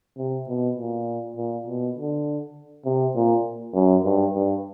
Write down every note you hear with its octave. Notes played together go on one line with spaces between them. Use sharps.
C3
B2
A#2
A#2
B2
D3
C3
A#2
F#2
G2
G2